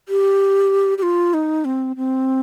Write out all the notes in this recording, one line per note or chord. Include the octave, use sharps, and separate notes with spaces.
G4
G4
F4
D#4
C4
C4